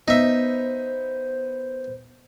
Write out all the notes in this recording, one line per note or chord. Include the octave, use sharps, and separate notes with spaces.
B3 D#4 C5 E5